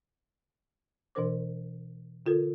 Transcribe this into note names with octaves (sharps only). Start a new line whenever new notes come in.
B2 E3 D4 A#4 C5 D6
D3 F4 A4 A#4